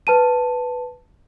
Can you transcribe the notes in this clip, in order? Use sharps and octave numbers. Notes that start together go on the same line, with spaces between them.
B4 A5 D#7